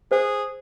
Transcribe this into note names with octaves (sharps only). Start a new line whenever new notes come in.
G#4 C5